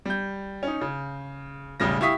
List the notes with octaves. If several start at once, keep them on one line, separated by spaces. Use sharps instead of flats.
G3 G6
C#4 D#4
C#3
E1 A1 C#3 G3 A#6
E4 G4 F5 C#6 D#6 B6